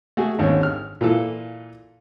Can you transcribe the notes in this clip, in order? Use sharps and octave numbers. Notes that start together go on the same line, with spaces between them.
A3 F#4 G#4
G#1 D#2 D3 C#4 C#5
F6
A#2 E3 F4 A4